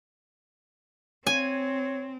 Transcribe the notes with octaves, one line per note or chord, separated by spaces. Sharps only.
C4 C#5 G#5